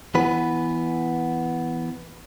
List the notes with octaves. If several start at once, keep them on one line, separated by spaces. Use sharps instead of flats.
E3 B3 B4